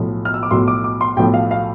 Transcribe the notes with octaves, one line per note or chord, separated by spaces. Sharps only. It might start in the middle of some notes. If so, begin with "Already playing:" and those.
Already playing: B1 A2 F3
F6
E6
D6
B1 A2 F3 C6
D6
D6
C6
B1 A2 F3 G5
F5
F5